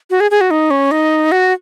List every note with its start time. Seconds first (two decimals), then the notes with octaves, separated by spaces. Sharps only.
0.10 F#4
0.20 G#4
0.31 G#4
0.41 F#4
0.51 D#4
0.71 C#4
0.91 D#4
1.32 F#4